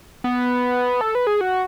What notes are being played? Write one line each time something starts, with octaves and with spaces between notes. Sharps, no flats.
B3
A4
B4
G#4
F#4